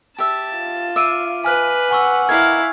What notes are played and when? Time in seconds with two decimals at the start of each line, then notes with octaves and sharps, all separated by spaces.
0.19 G4 E5 A5
0.58 F4
0.96 E5 F5 D6 D7 D#7
1.44 B4 G#5 F6 F#6
1.91 F#5 G#5 C#6 E6
2.29 E4 A#4 D5 D#5 F5 G#6